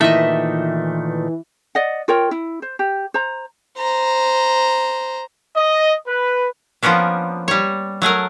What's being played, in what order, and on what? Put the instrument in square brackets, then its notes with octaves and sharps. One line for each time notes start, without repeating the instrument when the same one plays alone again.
[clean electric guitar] A#2 D#3 A3 [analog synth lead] E3 [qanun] D#5 E5
[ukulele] D5 D#5 F#5
F4 A#4 C#5 G5
E4
C5
G4
C5 A#5
[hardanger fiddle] C5 A#5
[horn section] D#5
B4
[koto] F3 A#3 B3 C#4 D4
G3 C#5
F#3 A3 G#4 A#4